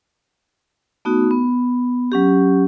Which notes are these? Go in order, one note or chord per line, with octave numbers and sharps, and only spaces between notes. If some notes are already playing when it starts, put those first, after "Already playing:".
A3 B3 D#4 F#4
B3
F#3 C#4 G4